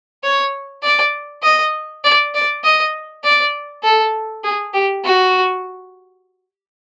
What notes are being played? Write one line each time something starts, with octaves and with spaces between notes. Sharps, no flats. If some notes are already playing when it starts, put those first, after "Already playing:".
C#5
D5
D#5
D5
D5
D#5
D5
A4
G#4
G4
F#4